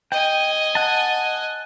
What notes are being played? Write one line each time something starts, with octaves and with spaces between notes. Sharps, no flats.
D#5 G5 G#5
F#5 A5